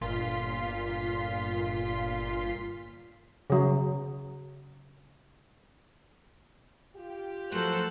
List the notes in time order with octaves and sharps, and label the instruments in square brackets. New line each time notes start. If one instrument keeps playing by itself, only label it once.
[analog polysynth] G1 A#2 F4 C6 B6
[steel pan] C#3 F#3
[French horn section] F4 G4
[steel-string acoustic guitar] F3 F#3 A3 [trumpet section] F#4 A#4 C5 [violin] A4 F#6